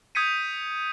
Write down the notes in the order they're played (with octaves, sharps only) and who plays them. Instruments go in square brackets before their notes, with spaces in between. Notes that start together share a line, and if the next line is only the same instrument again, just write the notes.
[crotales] D#6 G6 G#6 B6 C#7 D#7